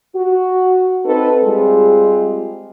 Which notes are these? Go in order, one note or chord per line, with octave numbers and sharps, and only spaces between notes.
F#4
C4 D#4 A4 B4
G3 G#3 C4 F4 G#4